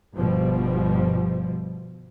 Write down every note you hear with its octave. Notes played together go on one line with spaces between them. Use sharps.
G1 B2 F3 G3